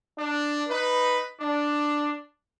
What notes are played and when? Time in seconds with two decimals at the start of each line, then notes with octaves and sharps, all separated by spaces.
0.17 D4
0.69 D#4 B4
1.41 D4